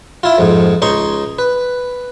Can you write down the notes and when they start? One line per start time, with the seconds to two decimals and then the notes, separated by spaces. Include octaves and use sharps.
0.23 E4 F4
0.38 F2 G#2
0.82 C#2 D#4 C6 C#6
1.39 B4